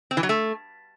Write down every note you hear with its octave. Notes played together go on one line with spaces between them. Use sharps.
C4
E3
F#3
A3